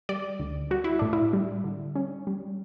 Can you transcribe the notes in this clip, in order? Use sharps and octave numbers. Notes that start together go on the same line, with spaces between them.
G3 D5
D2
G3 F#4
E4
A2 D4
E4
G3
D3
G3 C#4
G3